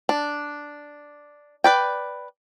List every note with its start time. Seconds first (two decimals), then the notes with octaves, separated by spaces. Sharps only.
0.09 D4
1.64 B4 D5 G5